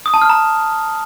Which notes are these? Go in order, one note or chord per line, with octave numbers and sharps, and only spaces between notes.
D#6
A5
F6
A#5